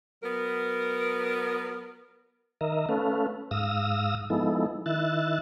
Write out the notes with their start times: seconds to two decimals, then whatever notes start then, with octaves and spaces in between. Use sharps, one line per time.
0.23 F#3 B3 A#4
2.61 D#3 A#4 D#5 E5 A#5
2.89 A3 C#4 A4 B4 F5
3.51 G#2 F5 D#6 E6 A#6
4.30 F3 G#3 B3 D#4 E4 A4
4.86 D#3 E4 E5 F#6 A6